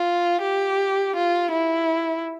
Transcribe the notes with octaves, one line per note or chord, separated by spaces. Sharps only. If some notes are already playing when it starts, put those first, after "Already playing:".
Already playing: F4
G4
F4
E4